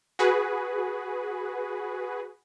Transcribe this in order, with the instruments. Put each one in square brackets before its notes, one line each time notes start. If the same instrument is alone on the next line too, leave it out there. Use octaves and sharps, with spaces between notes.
[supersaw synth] F#4 G#4 B4